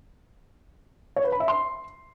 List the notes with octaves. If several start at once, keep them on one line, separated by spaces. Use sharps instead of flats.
C#5
B4
B5
E5
C6